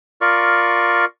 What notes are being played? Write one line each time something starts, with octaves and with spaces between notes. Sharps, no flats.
F4 A#4 D5 C#6